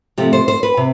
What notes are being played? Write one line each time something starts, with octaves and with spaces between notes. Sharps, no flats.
C3 F3 A3 C4 G4
C5
C5
B4
C3